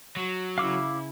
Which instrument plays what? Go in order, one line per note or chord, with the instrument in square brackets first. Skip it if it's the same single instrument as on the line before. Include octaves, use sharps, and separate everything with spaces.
[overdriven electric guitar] F#3
[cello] C#3 E4 [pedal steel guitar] F5 D6 E6